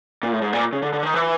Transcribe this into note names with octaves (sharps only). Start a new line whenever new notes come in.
A#2
A2
G#2
A#2
C#3
D3
D3
D#3
E3